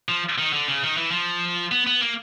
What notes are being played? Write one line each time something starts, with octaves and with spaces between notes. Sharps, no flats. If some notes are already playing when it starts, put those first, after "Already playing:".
F3
D#3
D3
C#3
D#3
E3
F3
B3
B3
A#3